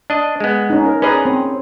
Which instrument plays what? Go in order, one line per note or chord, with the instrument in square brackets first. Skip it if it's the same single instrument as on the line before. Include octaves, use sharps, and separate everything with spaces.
[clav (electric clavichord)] D4 D#5
G#3 B3
[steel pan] C#4 D#4
A#4
[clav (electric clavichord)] C#4 G#4 [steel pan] B4 D5 A#5
[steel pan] C4